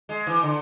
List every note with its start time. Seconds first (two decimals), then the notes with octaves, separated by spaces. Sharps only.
0.09 G#3
0.27 E3
0.43 D3